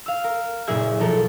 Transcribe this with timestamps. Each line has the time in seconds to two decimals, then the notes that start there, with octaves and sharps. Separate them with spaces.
0.06 F5 E6
0.24 A#4
0.67 F#1 A#2 G#4 E5 G#6
1.00 B1 F3 A4 A#4